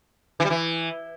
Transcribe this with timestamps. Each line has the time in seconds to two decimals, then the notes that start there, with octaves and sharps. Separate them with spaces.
0.40 E3
0.45 G3
0.50 E3